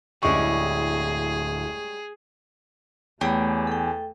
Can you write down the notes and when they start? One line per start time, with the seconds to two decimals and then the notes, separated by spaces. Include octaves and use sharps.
0.23 D1 G3 G#3 C#4 E4 G#4 C#6
3.21 E2 A3 G4 G#4 C#5 G5 B5
3.67 A4 G5